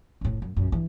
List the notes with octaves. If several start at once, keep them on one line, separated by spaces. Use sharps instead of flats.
F1 A2
F#2
A#1 F#2
G2 E3